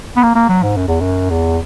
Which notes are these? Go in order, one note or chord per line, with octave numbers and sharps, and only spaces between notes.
B3
A#3
A#3
F#3
G#2
F#2
E2
F#2
E2